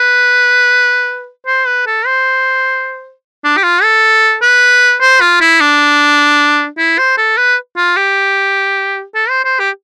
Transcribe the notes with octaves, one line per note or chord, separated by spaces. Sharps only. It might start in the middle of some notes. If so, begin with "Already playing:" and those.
Already playing: B4
C5
B4
A4
C5
D4
G4
F4
A4
B4
C5
F4
E4
D4
E4
C5
A4
B4
F4
G4
A4
C5
C5
G4